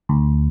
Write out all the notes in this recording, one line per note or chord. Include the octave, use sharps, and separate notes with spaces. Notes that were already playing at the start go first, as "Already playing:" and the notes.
D2